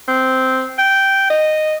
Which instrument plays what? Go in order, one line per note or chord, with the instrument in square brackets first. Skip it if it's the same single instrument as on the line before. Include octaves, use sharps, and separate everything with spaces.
[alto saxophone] C4
G5
D#5